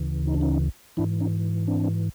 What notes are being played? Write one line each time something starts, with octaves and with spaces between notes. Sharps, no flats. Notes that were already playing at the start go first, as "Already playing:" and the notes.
Already playing: D2 C#3 E3
D#4
D4
C#4 D#4
G#2 E3 D4 E4
C#4 D#4
C4 D4